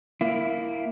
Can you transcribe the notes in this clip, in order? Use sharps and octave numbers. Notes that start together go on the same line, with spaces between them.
A#3 E4